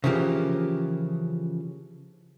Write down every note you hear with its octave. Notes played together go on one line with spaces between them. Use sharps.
C#3 E3 F3 A#3 G4